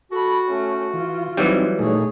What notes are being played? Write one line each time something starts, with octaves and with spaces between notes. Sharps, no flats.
F#4 A4 B5
A3 C#4
E3 F4
E3 F#3 G3 C4 D#4
A#2 A3 D#4 G#4 C#5